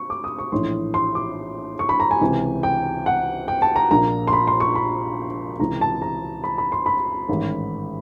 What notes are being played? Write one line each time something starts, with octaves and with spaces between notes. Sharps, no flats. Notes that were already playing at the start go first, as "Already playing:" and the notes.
Already playing: C#6
D6
D#6
C#6
A#1 A2 E3 C6
C6
D6
C#6
B5
A#5
G#5
C#2 C3 E3
G5
F#5
G5
A5
A#5
A#1 A#2 A#5
C6
B5
C6
C#6
B5
C#2 C3 E3 A#5
A5
A#5
B5
B5
C6
B5
A1 G#2 D#3